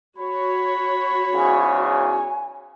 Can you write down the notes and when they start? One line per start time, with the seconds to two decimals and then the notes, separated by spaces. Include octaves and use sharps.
0.18 F#4 C#5 B5
1.34 E2 G#2 C#3 G#5